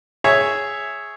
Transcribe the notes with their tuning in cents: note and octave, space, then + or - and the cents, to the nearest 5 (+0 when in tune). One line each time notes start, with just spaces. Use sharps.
G#4 +0 C#5 +0 E5 +0